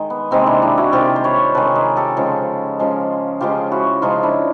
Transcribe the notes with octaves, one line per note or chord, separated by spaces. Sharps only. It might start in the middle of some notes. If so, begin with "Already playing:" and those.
Already playing: D#3 G#3
B3
C3 D#3 G#3 A#3 C4
D4 E4
D4 E4
E4 F#4
C3 D#3 G#3 F4 G4
C5
B4 C#5
C3 D#3 G#3 A4 B4
G#4 A#4
G4 A4
C#3 F3 G#3
C#3 F3 G#3
C#3 F3 G#3 F4 G4
E4 F#4
C#3 F3 G#3 D#4 F4
D4 E4